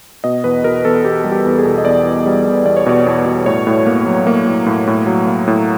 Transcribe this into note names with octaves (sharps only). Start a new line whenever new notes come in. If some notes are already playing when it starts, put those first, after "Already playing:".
B2 D#5
E2 B4
B2 A#4
E2 A4
E2 G4
G3
G4
E2
G#4
B2
D#5
E2 D5
E2
G3
E2
E2 D5
C#5
B2 D5
E2
B2
A2 C#5
A2
A#3
F#3
A#3
A2
A2
A2
F#3
A#3
A2